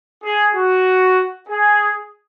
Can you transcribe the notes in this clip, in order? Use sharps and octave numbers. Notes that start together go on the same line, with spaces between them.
G#4
F#4
G#4